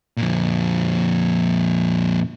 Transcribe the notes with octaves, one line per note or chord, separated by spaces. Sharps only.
F2 A#2